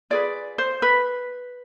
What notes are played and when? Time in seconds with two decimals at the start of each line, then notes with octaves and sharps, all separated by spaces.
0.10 F4 G#4 B4 D5
0.58 C5
0.82 B4